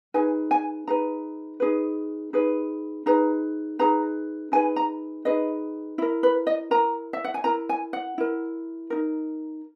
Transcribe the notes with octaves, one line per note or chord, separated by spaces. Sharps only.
D#4 G#4 B4 G#5
G#5
D#4 G#4 B4 A#5
D#4 G#4 B4
D#4 G#4 B4
D#4 G#4 B4 A#5
D#4 G#4 B4 A#5
D#4 G#4 B4 G#5
A#5
D#4 G#4 B4 D#5
E4 A#4 E5
B4
D#5
E4 A#4 A#5
E5
F#5
G#5
E4 A#4 A#5
G#5
F#5
E4 A#4
D#4 A#4